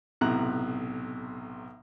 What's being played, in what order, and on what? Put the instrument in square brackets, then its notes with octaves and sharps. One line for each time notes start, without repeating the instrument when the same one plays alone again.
[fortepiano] B1 A2 C3 A#5 F#6